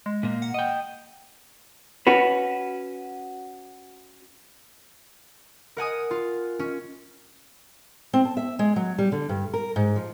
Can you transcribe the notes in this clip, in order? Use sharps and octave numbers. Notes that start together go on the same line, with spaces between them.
G#3
A#2 A#3
F#5
D#5 G5
C#4 F#4 B4
A#4 F#5 G#5 D#6
F4
C#4
C4
A5
E5
G#3
F#3
G3
D3
G2
A#4
G#2
F3